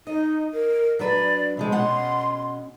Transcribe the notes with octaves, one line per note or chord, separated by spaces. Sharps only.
D#4 D#5
A#4
F#3 D4 B4 D5
C3 F3 G#3
B2 C#4 F#5 C6